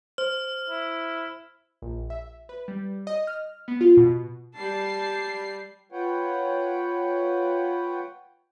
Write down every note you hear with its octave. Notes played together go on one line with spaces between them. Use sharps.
C5 F6
E4
A#1
E5
B4
G3
D#5
F6
B3
F4
B2
G3 A5 C7
F4 B4 C#5 F#5 G5